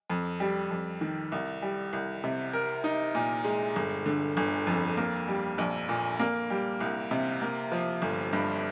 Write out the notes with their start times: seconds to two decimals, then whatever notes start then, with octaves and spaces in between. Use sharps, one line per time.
0.10 F2
0.40 G3
0.71 F2
1.01 D#3
1.32 C2
1.62 G3
1.93 C2
2.24 C3
2.53 A#4
2.84 D#4
3.15 A#2
3.44 G#3
3.76 G1
4.06 D3
4.37 G1
4.67 F2
4.97 A#3
5.28 G3
5.58 A#1
5.89 A#2
6.20 A#3
6.50 G3
6.80 C2
7.11 C3
7.42 A#3
7.72 F3
8.02 G1
8.33 G2